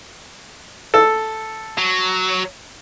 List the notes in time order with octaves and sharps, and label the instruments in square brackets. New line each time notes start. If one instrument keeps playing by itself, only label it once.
[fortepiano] A4
[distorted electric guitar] F#3